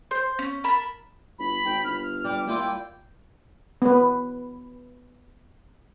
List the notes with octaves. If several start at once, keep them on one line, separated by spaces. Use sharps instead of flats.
C5
C#4
A#4 A5 B5
G1 B5
G#1 G5
G1 F6
G3 D6
A#2 G3 E4 F4 G5
B3 B4